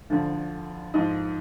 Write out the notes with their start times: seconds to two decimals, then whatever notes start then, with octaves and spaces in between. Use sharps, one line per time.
0.10 D2 D3 F3
0.94 G#2 F3 D#5